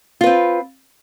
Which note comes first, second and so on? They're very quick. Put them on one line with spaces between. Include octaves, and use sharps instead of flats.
F4 B4 C4